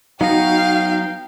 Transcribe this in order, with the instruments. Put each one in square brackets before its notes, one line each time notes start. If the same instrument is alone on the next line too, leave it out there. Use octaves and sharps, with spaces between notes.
[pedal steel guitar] F#3 B3 A#5 [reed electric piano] D#4 F#4 [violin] F5 [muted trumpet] G5